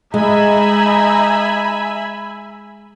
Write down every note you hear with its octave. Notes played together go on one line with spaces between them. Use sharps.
G#3 D#4 E5 G#5 B5